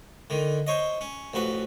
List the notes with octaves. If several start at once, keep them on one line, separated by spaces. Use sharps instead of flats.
D3 D#3
C5 C#5 D#5
C#4
A1 F3 F#4 B4